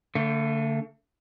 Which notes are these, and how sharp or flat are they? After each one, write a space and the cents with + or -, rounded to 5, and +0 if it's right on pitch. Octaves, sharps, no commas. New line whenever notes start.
D3 -25 A3 +35